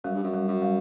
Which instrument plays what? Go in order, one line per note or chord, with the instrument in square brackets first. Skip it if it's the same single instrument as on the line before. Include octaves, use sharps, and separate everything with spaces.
[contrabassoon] F#2 [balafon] G3
[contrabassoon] G2
F#2
[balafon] G3
[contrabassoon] F#2
[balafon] G3